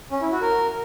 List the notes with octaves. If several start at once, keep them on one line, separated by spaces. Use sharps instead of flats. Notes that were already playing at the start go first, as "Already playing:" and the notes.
C#4
E4
F#4
A#4